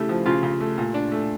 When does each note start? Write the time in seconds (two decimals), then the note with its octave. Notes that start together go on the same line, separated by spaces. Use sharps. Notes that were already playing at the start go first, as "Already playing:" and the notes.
Already playing: C#3 A3 E4 G4
0.09 F3
0.25 C#3 F4
0.43 C#3
0.60 A3
0.78 A#2
0.94 D4
1.12 A3